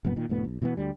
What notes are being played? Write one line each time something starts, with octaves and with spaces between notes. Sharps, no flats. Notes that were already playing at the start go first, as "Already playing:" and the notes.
F1 F#2 A#2 B3
A#2 D#3
F1 D2 A2 B3
B1
B2 E3 G#3 B3
D2 D3 G3